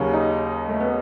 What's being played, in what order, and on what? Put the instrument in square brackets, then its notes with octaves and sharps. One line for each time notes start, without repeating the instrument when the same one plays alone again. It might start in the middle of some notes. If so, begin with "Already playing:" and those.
Already playing: [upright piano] D#2 C#3 F#3 C#4 F#4
[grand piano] D#4
A3
B3